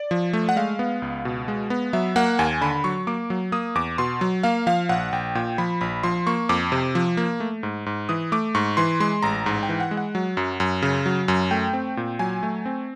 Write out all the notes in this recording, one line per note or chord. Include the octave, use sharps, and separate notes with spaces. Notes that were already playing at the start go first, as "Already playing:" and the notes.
Already playing: D5
F3
A3
F#5
G#3 F5
B3
C#2
B2
G#3
B3
F#3 E5
A#3 F#5
D#2 G#5
D3 B5
F#3 C#6
A#3 D6
F#3
A#3 D#6
E2 D6
B2 C6
F#3
A#3 F5
F3 F5
A#1 F#5
A#1 G5
A#2 G5
F3 B5
A#1 B5
F3 C6
A#3 C#6
F2 D6
C3
F3
A#3
A3
G#2
G#2
E3 D#6
A3 D6
G#2 C#6
E3 C6
G#3 C6
A1 A#5
G#2
G5
E3
F#5
G#3
F#5
F#3
F#2
F#2
C#3
F#3
F#2
A3 G5
C4
A#2
F#3 G#5
A3
C4